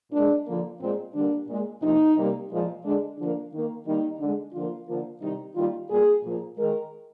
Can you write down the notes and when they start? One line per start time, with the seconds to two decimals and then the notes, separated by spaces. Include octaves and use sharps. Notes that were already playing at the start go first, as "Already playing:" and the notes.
0.12 A#2 G#3 D4
0.46 D3 F3 A#3
0.80 A#2 G#3 C4
1.14 D3 G3 A#3 D4
1.48 A#2 G#3
1.81 C3 F3 A#3 D#4
2.16 C3 G3 A#3
2.50 A#2 F3 G#3
2.84 D3 G#3 D4
3.18 D3 F3 A#3 D4
3.52 D#3 A#3
3.85 D#3 G3 A#3 D#4
4.19 D3 G#3
4.53 D3 F3 A#3 F4
4.87 D3 F3 A#3
5.21 C3 D#3 G3 D#4
5.55 D#3 G3 A#3 F4
5.89 A#2 G3 A#3 G#4
6.23 A#2 F3 A#3
6.57 D#3 G#3 A#4